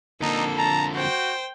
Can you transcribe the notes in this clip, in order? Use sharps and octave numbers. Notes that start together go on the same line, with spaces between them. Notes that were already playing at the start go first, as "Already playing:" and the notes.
F2 D3 A#3 D#4 A4
A5 A#5
F#4 C5 G5